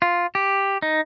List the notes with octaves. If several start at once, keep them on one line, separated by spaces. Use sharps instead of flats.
F4
G4
D#4